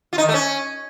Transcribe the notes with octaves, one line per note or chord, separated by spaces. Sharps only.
F4
D#4
D#3
A3
C#4